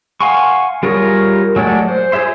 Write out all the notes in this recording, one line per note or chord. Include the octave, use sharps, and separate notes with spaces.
F5 F#5 G#5 C6 C#6
G3 F4 G#4 A#4 C#5
F#3 G#3 A3 D5 F#5
C5
F4 G#4 C#5 E5 C6